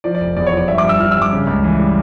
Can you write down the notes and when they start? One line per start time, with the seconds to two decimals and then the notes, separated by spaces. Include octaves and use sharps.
0.04 F3 D5
0.15 D5
0.21 F1
0.37 E2 D5
0.47 C#5
0.52 F3
0.57 D5
0.68 G2 E5
0.78 D6
0.84 G2
0.89 E6
1.00 F3 F6
1.11 E6
1.17 G2
1.22 D6
1.33 C#3
1.47 C#2
1.64 E3
1.79 G3